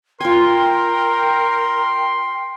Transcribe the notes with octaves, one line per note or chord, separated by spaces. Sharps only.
F4 A#4 G5 G#5 C6